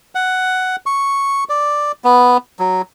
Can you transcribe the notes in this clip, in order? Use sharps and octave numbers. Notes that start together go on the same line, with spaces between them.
F#5
C#6
D5
B3
F#3